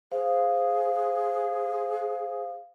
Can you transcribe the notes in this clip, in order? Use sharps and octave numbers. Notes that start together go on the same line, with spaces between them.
G#4 C5 F5